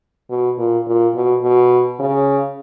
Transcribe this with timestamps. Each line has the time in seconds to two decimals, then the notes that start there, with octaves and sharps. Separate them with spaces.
0.30 B2
0.58 A#2
0.87 A#2
1.15 B2
1.43 B2
1.99 C#3